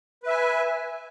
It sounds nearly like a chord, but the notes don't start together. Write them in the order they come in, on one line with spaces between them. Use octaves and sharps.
B4 E5 G#5